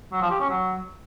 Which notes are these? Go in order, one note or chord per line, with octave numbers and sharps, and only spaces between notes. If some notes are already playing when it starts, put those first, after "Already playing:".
F#3
F3
G4
C#4
F#3